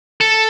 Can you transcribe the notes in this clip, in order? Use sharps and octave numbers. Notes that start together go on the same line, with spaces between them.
A4